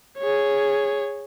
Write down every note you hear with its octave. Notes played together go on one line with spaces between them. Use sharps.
G#4 C#5